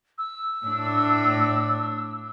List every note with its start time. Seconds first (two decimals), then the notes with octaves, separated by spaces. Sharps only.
0.18 E6
0.66 A2 D4